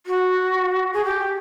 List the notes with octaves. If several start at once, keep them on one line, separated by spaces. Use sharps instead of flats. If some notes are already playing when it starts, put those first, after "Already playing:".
F#4
G#4
G4